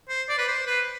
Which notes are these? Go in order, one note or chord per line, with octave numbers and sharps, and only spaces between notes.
C5
D5
B4
C5
B4